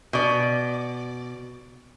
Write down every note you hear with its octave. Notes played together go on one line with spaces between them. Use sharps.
B2 D5